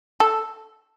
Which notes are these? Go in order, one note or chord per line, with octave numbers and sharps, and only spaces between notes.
A4